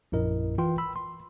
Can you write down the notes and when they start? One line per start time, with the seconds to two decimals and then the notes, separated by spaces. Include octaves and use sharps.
0.12 A#1 F#2 E4 A#4 D#5
0.58 E3 F4 B4 G5 C6
0.78 B5 E6
0.96 C6